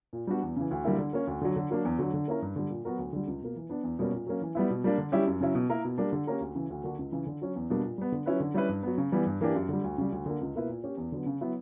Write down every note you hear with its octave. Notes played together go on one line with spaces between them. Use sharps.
A#2
G3 B3 D4 F#4
E2
C#3 E3
D2
D3 G3 A#3 E4
D3
A#3 C#4
D2
D3 F#3
D3
F#3 A#3 D4
E2
D3 F#3
D3
A#3 C#4 E4 A#4
G2
D3 G3
A#2
F#3 B3 F#4 A#4
D2
D3 G3
C#2
B2 A#3
E3
B3 D4
E2
B2 G3 A#3 C#4
A#2
F#3 A#3 C#4
E3
G3 B3 E4
B2
G3 A#3 D4
D3
G3 C#4 E4 G4
F#2
C#3 F#3 C#4 E4
B2
A#3 E4 A#4
B2
G3 A#3 D4 G4
D3
A#3 C#4 G4 A#4
D2
C#3 E3
D2
D3 A#3 D4 F#4
C#2
C#3 E3
D3
F#3 C#4
E2
B2 G3 A#3 D4
A#2
G3 B3
D3
F#3 C#4 E4 B4
D3
G3 C#4 E4 B4
G2
F#3 B3
C#3
E3 G3 B3
G2
E3 A#3 D4 G4
F#2
D3 G3
D2
C#3 G3
D2
D3 A#3
C#2
B2 A#3 E4 B4
A#2
A#3 C#4 G4
E2
D3 F#3 B3
C#3
F#3 B3 E4 B4